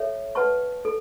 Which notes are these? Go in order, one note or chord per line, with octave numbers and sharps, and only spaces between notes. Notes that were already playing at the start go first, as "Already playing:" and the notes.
Already playing: A4 C#5 E5
B4 F#5 A5 C#6
A4